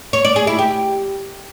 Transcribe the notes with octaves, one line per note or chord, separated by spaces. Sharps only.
C#5
D5
G#4
E4
G4